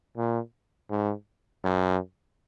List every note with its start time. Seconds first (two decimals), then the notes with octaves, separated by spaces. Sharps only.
0.17 A#2
0.90 G#2
1.64 F#2